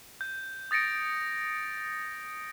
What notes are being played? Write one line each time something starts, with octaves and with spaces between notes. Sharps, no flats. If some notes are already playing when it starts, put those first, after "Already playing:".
G6
D#6 A6 A#6 C#7 D7